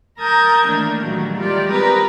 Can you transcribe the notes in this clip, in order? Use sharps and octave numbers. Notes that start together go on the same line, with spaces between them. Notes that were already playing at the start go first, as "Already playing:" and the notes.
A#4 A5 A#5 D#6 G6 G#6
D#3 E3 A3 A#3 D4
A#2 D#3 E3 F#3 G3 A3
D#3 G3 G#3 F4 G4 D5
C4 G4 A#4 B4 A#5 D#6